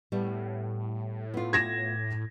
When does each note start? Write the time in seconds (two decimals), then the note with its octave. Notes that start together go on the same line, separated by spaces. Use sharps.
0.12 A2 G3 B3
1.34 B3 F4
1.53 G#6 A#6 E7